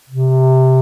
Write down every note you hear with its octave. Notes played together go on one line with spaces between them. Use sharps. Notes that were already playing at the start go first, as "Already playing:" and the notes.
C3